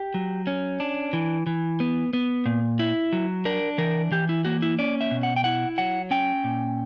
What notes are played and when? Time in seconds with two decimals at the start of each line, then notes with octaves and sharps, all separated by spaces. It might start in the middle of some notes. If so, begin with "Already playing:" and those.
Already playing: G4
0.14 F#3
0.47 C#4
0.80 D4
1.13 E3
1.47 E3
1.80 B3
2.13 B3
2.46 A#2
2.79 E4
3.13 F#3
3.45 D4 A#4
3.78 E3 A#4
4.11 E3 G4
4.29 E4
4.45 A#3 F#4
4.62 E4
4.79 C#4 D5
5.01 E5
5.11 B2
5.23 F#5
5.36 G5
5.44 E4 F#5
5.78 F#3 F#5
6.11 C#4 G5
6.44 A#2